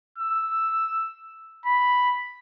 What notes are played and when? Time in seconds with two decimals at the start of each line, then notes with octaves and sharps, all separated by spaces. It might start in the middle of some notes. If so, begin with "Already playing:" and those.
0.18 E6
1.65 B5